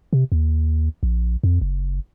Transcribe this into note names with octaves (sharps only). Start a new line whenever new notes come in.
C3
D#2
A#1
F2
F#1